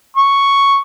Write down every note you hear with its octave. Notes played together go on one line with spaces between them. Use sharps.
C#6